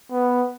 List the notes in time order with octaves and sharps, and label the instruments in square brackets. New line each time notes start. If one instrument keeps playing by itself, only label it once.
[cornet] B3